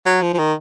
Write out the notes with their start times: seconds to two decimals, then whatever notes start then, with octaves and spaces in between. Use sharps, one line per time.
0.06 F#3
0.22 F3
0.34 F3
0.38 D#3